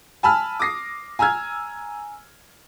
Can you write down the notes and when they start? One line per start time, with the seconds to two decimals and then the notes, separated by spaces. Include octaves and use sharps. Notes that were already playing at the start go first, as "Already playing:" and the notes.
0.23 G#5 A5 B5 E6 F6
0.60 D6 D#6 A#6 C7
1.19 G#5 A#5 E6 F6 G#6